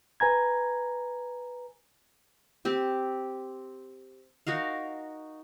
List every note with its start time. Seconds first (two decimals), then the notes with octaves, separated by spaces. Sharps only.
0.20 B4 G#5 A#5 G#6
2.65 C4 G4
4.47 D#4 F#4 A#4 F5